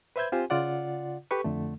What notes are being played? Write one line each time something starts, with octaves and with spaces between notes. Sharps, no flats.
B4 C5 E5 B5 G6 G#6
C4 F4 G4 C5 G#5
C#3 F4 D5 F#5
G4 A4 B4 C#6
F2 D3 A3